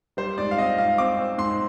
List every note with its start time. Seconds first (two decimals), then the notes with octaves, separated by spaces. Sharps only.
0.17 G3 C5
0.38 G#2 D5
0.51 F5
0.57 C4 D#5
0.77 G#2 F5
0.98 C4 D6
1.18 C4
1.38 G#2 C6